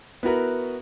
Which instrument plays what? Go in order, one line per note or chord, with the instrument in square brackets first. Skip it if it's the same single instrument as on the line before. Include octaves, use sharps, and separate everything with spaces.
[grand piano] B3 E4 F#4 A#4 B4